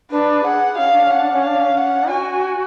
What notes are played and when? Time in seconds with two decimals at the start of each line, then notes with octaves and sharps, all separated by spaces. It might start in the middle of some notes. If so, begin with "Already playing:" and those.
0.11 D4 B4
0.44 G#4 F#5
0.77 C#4 F5
0.91 D4
1.05 C#4
1.10 F#5
1.19 D4
1.32 C#4
1.43 D4 F5
1.60 C#4
1.77 F#5
2.10 F#4 G#5